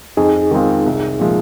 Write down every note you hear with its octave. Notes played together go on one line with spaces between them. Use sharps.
F2 D#4 G#4
D#3 G#3 C4 F4
C2
A#2 F3 G#3